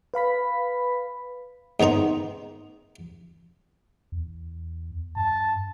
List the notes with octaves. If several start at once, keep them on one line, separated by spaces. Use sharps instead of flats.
B4 F5 B5 B6
G#2 D#3 B3 A#5 C6
E2
G2 A5